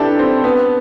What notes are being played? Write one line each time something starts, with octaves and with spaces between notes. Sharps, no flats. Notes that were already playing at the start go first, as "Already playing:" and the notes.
Already playing: D4 E4 G4 A4 B4
C4
B3